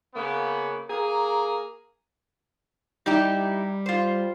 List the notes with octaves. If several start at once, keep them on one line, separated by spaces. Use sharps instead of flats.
C#3 A#3 B3
A#3 G#4 A#5
G3 D#4 E4 G4
F4 C5